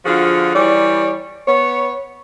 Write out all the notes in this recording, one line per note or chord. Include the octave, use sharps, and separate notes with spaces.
D3 F3 F4 F#4 G#4
E3 G3 C#5 D5
B3 C#5